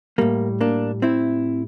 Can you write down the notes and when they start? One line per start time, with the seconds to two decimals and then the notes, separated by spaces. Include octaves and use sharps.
0.18 A2 G3 A#3
0.61 A#3 D4
1.02 C4 E4